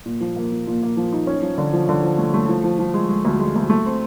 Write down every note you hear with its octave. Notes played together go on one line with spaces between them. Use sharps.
A#2
F3
A#3
A#2
A#2
A#3
F3
D#4
C#4
F3
D3
F3
D3
F3
A3
A3
F3
F3
F3
G#3
G#3
D2
G#3
D2
A3
C4